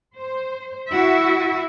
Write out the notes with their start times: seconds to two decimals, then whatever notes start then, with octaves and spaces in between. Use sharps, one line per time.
0.16 C5
0.90 E4 F#4 E5